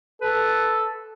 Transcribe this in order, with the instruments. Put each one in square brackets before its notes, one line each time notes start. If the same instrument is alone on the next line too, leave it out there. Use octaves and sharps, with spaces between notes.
[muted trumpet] A4 [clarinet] B4